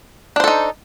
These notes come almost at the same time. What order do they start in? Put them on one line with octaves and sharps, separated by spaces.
D4 C5 A4 D#4